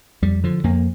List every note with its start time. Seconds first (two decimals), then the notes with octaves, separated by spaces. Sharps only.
0.22 F2 G3
0.44 D3 F3
0.64 F2 A#3